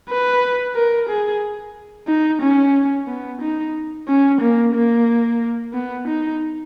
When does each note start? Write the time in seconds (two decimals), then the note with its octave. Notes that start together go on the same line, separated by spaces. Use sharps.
0.09 B4
0.75 A#4
1.09 G#4
2.07 D#4
2.41 C#4
3.07 B3
3.41 D#4
4.08 C#4
4.40 A#3
4.75 A#3
5.74 B3
6.07 D#4